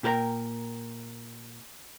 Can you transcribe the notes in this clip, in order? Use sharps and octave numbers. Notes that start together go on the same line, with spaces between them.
A#2 G4 A#4 B4 G5 A#5